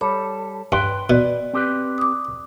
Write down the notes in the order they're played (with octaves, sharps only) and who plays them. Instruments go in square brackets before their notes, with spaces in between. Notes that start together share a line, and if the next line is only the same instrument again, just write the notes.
[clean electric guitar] G3 A4 [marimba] C#5 B5 D6
[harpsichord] G2 [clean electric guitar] B4 G5 C6
[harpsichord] B2 [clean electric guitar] B4 [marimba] D5
[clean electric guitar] C4 G4 B4
[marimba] D6 D#6